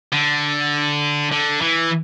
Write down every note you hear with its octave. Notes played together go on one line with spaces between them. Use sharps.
D3
D3
E3